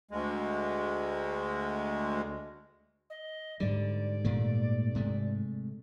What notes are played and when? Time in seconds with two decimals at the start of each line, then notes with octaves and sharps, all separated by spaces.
0.11 D2 G#3
3.10 D#5
3.60 G#2 D3 G3 D5
4.25 A#2 A3
4.95 C3 G#3 A3